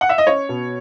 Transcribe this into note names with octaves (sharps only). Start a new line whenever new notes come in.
F#5
E5
D#5
C#4 C#5
B2